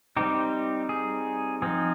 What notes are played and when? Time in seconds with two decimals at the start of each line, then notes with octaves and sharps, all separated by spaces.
0.17 G3 C4 D#4 G4
0.89 G#4
1.62 F3 C4 D#4 G#4